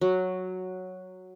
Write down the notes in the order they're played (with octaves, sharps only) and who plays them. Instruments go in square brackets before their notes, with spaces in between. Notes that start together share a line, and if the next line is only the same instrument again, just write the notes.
[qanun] F#3